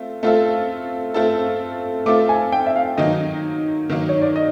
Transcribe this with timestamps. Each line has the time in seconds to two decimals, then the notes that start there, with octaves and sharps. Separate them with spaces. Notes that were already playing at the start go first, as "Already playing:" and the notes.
Already playing: A3 C4 F4
0.23 A3 C4 F4 A4
1.14 A3 C4 F4 A4
2.06 A3 C4 F4 A4 D6
2.29 G#5
2.52 G5
2.67 E5
2.76 F5
2.97 D#3 F#3 A#3 D#4 D#5
3.90 D#3 F#3 A#3 D#4
4.09 C#5
4.22 D5
4.36 D#5